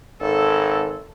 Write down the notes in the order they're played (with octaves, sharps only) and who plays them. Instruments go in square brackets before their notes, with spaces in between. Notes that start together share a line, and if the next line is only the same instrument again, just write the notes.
[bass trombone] G#1 [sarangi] A4